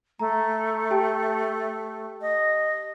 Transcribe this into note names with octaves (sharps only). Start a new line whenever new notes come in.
A3 A#5
G4 G5 A5
D#5